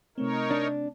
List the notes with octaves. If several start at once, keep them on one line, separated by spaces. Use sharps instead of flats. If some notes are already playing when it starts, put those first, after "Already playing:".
C3 A3 C4 D#4 A#4 C#5
D4